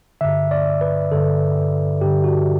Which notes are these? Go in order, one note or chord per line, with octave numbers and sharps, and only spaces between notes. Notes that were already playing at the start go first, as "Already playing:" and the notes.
G2 D3 E5
D5
B4
G2 D3 A4
G2 D3 G4
F#4